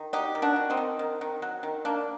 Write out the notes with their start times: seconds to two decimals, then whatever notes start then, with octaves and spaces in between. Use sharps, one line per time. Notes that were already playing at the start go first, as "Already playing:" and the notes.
Already playing: D#3
0.13 F#3 D#4 G4
0.35 D#3
0.42 D4 F#4
0.56 D#3
0.70 C4 D#4
0.77 D#3
0.99 D#3
1.21 D#3
1.42 F#3
1.63 D#3
1.85 A#3 D4